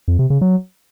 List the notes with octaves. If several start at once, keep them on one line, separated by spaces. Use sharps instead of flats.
F2
C3
C#3
F#3